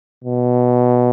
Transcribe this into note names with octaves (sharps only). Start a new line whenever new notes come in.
B2